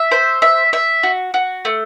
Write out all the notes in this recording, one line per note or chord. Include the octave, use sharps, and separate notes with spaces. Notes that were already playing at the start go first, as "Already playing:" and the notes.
Already playing: E5
C5
E5
E5
F#4
F#4
A3